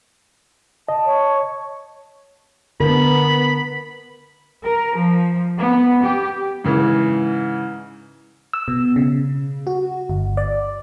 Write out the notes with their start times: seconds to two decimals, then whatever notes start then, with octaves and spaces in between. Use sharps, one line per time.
0.89 D#5 A5
1.06 C#5
2.80 D3 B3 A#4 B5
4.65 A#4
4.97 F3
5.59 B3
6.04 G4
6.64 G#2 C#3 E3
8.53 E6
8.68 B2
8.96 C#3
9.67 F#4
10.10 G1
10.37 D5